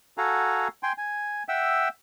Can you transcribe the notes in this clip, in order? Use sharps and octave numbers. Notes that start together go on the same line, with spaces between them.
F#4 A4 F5 F#5 G#5 A#5
G5 G#5 C6
G#5
E5 F#5 G5 E6